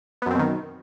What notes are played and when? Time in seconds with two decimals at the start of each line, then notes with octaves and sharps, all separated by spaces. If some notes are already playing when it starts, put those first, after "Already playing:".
0.22 B3
0.26 F#2
0.31 C4
0.35 B2
0.39 D#3